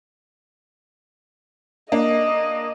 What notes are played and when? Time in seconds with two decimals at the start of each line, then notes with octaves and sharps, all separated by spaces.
1.92 A#3 D4 D#5